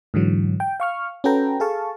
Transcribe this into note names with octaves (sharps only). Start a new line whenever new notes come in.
G#2 D3 E3 F#3
G5
F5 C#6 F6
C#4 F#4 A4 B4 G5 A#5
G#4 A4 F5 A5 C#6